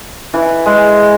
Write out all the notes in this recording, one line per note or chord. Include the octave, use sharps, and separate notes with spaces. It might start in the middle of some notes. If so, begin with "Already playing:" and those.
E3
G#3